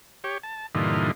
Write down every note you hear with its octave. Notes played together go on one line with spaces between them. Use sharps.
G4 C#5
A5
G2 A#2 D3 E3 D#4 F4